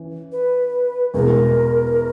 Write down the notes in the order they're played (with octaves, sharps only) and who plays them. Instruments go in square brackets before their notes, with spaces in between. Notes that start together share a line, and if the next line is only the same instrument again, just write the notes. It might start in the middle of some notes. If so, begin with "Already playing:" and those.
Already playing: [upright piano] E3 C#4
[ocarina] B4
[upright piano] E2 B2 G#3 [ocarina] A#4